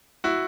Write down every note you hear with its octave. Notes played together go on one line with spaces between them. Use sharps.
E4 F#4